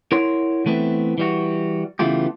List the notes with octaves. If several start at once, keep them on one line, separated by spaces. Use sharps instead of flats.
E4 A#4 C#5 F#5 C6
E3 A3 B3 C4
E3 G3 F#4
C#3 E3 A3 B3 F4 G4